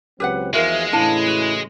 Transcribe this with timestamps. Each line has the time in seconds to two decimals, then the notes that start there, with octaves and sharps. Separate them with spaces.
0.20 C#2 F#3 C4 G4 B4 F#5
0.53 E2 F3 G#3 E4 F#4 A#4 E5 F5
0.92 A2 C#3 E3 D4 E4 F5 A5
1.27 F#4